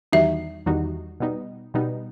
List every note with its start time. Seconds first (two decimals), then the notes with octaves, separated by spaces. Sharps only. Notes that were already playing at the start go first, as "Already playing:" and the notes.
0.12 E2 D#3 G3 D#4 F#4 E5
0.66 E2 D#3 G3 D#4 F#4
1.20 B2 G3 B3 D#4
1.74 B2 G3 B3 D#4